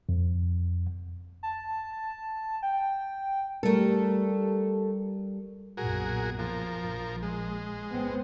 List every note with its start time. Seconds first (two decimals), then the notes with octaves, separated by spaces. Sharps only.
0.09 F2
1.43 A5
1.93 A5
2.63 G5
3.63 G3 A3 A4 A#4
5.77 B1 F#2 A#2 F#4 G#4 A#4
6.39 F3 A#4
6.82 A#1
7.23 G#3
7.90 B3 C4